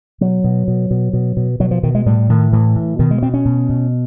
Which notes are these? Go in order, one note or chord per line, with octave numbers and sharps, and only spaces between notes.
B2 F#3
B2
B2
B2
B2
B2
B2 F#3
F3
B2 D#3
G#3
A2 G3
A2 D#3
A2 E3
A2
B2 D#3
G#3
B2 C4
C#4
B2
B2